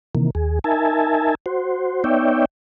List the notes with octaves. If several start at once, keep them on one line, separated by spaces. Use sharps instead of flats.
C3 D#3 E3 A#3
D#2 G#4
D#4 A#4 E5 G#5 A5
F#4 C5
B3 D#4 C#5 D5 E5 G5